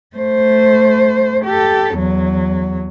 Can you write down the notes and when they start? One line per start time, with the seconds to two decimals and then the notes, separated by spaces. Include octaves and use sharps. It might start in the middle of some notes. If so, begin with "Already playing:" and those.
0.16 A3 C5
1.45 G4 A4
1.96 E2 F#3